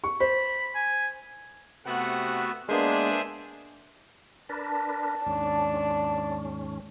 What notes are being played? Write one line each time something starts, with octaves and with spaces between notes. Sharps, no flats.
C#6
C5 B5
G#5
C3 A3 B3 F#4 F#5
G#3 A#3 B3 D4 G#4 C5 E5
D4 A#4 B4 A5
D#2 G#2 C#4 D4